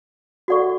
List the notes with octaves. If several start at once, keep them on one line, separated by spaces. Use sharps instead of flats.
F#4 A4 D5 F#5 C#6